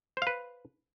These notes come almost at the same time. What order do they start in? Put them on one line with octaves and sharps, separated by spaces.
C5 F5 B4